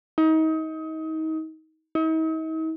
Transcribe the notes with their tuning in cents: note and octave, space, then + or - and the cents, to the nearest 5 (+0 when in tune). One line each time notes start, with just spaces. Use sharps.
D#4 +30
D#4 +45